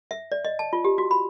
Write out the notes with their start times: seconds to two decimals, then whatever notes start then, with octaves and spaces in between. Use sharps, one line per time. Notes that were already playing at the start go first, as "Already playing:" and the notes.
0.11 E5
0.32 D5
0.45 D#5
0.59 A5
0.73 F4
0.85 G4
0.98 F#4
1.11 B5